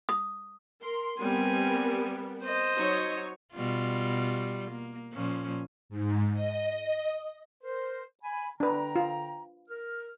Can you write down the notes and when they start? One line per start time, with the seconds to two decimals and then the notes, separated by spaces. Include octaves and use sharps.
0.09 D#6
0.81 A#4 C6
1.19 G3 B3 C4 A#4 G#5
2.43 C5 D#5
2.76 F#3 D#4 C#5
3.54 B2 G3 F4
4.71 A#3
5.13 A#2 F3 C#4
5.89 G#2
6.34 D#5
7.63 A#4 C5
8.23 G#5 B5
8.60 D3 D4 B4 G5 A#5
8.96 F4
9.70 A#4 F6